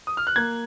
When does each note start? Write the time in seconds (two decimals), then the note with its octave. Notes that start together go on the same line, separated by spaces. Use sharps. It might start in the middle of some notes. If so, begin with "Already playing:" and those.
0.07 D#6
0.17 F6
0.27 F#6
0.36 A#3 G#6